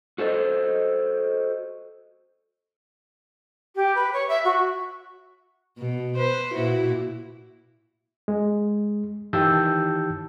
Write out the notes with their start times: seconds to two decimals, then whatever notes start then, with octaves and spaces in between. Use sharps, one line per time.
0.18 F#4 A4 C5 D#5
3.76 G4
3.95 B4
4.13 C#5
4.28 E5
4.45 F#4
5.78 B2
6.16 B4 C5
6.55 A#2 E4 F#4
8.28 G#3
9.33 D#3 E3 G4 A5 E6 G6